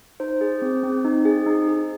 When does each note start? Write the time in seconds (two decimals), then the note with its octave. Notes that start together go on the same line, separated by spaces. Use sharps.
0.20 D#4 C5
0.41 G#4
0.62 C4
0.83 C4
1.05 D#4
1.25 G#4
1.46 D#4
1.68 G#4